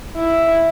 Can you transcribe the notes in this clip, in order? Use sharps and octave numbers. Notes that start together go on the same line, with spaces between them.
E4